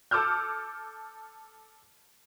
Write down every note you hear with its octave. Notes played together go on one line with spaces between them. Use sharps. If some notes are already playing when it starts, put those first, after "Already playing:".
A4 D6 E6 F6 G6